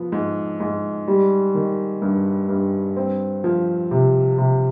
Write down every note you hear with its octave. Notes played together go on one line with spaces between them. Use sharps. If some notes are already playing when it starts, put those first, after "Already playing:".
Already playing: F3 B3
G#2
G#2
G3
D#3
G2
G2
C4
F3
C3
C3